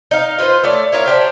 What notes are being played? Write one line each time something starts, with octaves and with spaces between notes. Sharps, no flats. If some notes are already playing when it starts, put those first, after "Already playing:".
D#4 F5
F4 B4 C5
A3 C#5 D5
E4 A#4 C#5 F5
D4 G4 C5